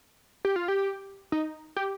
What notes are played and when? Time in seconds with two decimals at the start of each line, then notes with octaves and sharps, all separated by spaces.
0.45 G4
0.56 F4
0.68 G4
1.32 D#4
1.76 G4